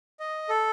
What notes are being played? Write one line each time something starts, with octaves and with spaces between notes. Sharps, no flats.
D#5
A4